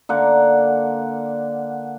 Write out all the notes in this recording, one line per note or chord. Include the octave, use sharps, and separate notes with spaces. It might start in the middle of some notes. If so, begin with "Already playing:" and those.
D3 A#3 F#5